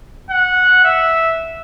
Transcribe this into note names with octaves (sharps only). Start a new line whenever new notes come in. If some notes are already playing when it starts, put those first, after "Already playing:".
F#5
E5